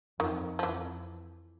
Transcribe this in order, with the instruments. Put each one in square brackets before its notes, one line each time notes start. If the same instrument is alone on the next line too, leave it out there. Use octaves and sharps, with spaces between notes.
[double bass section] F2 [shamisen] D#3
[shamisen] F3
[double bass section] F2 [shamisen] E3